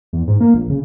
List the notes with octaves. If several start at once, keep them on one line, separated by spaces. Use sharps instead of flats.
E2
G#2
A#3
A#1
C#3